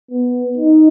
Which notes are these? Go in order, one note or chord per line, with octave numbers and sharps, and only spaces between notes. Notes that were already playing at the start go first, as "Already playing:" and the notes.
B3
D#4